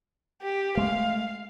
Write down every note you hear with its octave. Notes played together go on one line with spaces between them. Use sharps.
G4
G#3 A3 F5